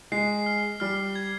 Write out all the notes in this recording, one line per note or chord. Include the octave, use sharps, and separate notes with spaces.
G#3 C7
F6
G3 F6
G#6